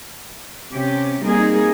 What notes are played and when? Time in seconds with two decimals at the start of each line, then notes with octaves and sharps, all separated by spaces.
0.73 C3 C#4 G4
1.23 G3 A#3 C4 D#4 G#4